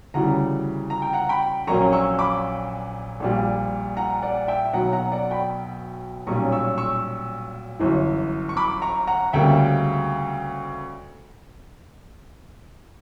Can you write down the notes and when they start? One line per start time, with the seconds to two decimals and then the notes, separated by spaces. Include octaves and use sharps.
0.14 D2 C#3 E3 G3 F#5 A#5
0.90 A#5
1.02 G5
1.13 F#5 A#5
1.29 G5 B5
1.67 A#1 A#2 F#3 A#3 C#4 A#5 C#6
1.92 C#6 E6
2.19 B5 D6
3.20 A#1 A#2 G3
3.97 F#5 A#5
4.22 D5 F#5
4.48 E5 G5
4.73 B1 B2 F#3 F#5 A#5
4.93 F#5 A#5
5.12 D5 F#5
5.31 G5 B5
6.27 B1 A#2 G3 C#4 A#5 C#6
6.52 C#6 E6
6.78 C#6 E6
7.80 G1 F#2 E3
8.49 C#6
8.57 B5 D6
8.82 A#5 C#6
9.07 F#5 A#5
9.33 D2 C#3 G3 A#3 E5 G5